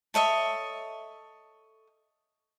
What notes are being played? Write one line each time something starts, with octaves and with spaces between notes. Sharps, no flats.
A4 C#5 D#5 E5